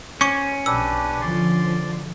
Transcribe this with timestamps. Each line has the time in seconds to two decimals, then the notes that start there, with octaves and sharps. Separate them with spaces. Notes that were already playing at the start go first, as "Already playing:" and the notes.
0.21 C#4 C5 C#6 D6 C#7
0.66 B1 D4 G4 B4 E6
1.21 D3 F3 D5 C6